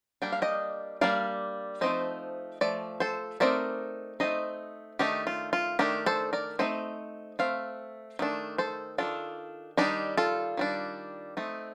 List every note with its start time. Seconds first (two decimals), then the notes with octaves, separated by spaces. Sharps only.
0.22 G3 A#3 D4 G5
0.32 F5
0.42 D#5 G5
1.01 G3 A#3 D4 D5 F5
1.81 F3 A3 C4 D#4 C5 D#5
2.61 F3 A3 D5
3.00 A4 C5
3.40 A3 C4 D#4 A#4 D5
4.20 A3 C4 D#4 C5 D#5
4.99 D#3 A3 D4 D#4 G4
5.27 F4
5.53 F4
5.79 D#3 A3 D4 G4 A#4
6.06 A4 C5
6.33 A#4 D5
6.59 A3 C4 D#4 C5 D#5
7.39 A3 C4 F5
8.19 D#3 A3 D4
8.58 A4 C5
8.98 D#3 A3 D4 F4 A4
9.77 D#3 G3 D4 D#4 G4
10.17 F4 A4
10.57 D#3 G3 D4
11.37 A3 C4 D#4